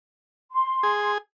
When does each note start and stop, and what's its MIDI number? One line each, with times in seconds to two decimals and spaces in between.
0.52 1.11 84
0.83 1.18 68